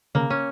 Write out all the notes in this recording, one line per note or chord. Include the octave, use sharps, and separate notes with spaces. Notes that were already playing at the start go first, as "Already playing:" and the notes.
C#3 A#3
C#4